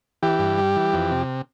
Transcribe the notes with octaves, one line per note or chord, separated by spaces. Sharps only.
E3 G4
G2
G3
E3
F2
C3